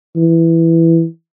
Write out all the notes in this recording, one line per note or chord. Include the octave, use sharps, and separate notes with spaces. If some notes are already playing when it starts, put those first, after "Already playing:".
E3